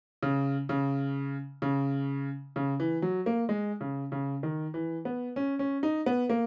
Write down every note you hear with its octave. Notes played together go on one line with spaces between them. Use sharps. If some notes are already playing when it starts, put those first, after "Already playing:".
C#3
C#3
C#3
C#3
E3
F#3
A#3
G#3
C#3
C#3
D#3
E3
B3
C#4
C#4
D#4
B3
A#3